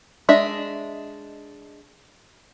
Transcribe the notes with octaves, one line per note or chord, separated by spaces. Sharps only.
G#3 D4 D#5 E5